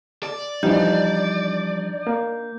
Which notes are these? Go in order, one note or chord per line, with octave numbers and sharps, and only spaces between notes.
D5
E3 F3 G3 D4 D#4 G6
A#3